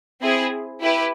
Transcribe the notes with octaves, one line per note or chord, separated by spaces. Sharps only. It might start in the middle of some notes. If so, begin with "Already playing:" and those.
C4 E4 G#4
E4 G4 B4